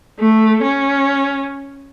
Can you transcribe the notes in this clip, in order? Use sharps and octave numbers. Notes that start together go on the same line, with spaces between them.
A3
C#4